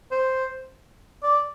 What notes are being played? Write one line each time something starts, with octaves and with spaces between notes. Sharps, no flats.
C5
D5